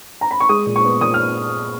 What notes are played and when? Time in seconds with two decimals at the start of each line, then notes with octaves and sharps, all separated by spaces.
0.21 A#5
0.31 B5
0.40 C#6
0.49 G#3 D#6
0.66 A#2
0.76 C#6
0.84 B3
1.01 A#2 D#6
1.14 F6